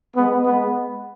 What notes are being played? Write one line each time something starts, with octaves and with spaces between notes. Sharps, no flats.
G#3 B3
G#3 B3